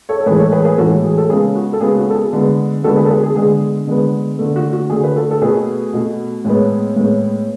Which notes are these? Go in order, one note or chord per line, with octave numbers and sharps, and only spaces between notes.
A4 C#5
A4
A2 E3 G#3 G#4 B4
A4 C#5
G#4 B4
G#4 B4
A2 E3 G#3 F#4 A4
G#4
A4
C#3 G#3 B3 G#4
F#4
A4
C#3 G#3 B3 G#4
F#4
A4
G#4
D3 G#3 B3
D3 G#3 B3 F#4 A4
G#4 B4
A4
G#4 B4
G#4
D3 G#3 B3 G#4
D3 G#3 B3
D3 A3
F#4
F#4
D3 A3 G#4
B4
F#4 A4
A4
B2 A3 G#4 B4
B2 A3
A2 G#3 B3
A2 G#3 B3